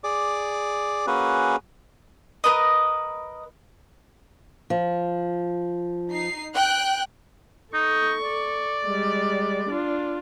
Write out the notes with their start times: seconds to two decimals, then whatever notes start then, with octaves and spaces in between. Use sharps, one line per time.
0.04 G#4 D5 D6
1.07 A#3 C#4 F#4 G#4 B4
2.44 A#4 B4 D#5
4.70 F3
6.11 D#4 C7
6.54 G5 F#6
7.73 D#4 A4 C#6
8.22 D5
8.85 G3 G#3
9.69 D4 F4